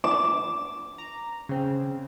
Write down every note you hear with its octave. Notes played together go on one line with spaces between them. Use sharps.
D6 E7
A#5
C#3 C4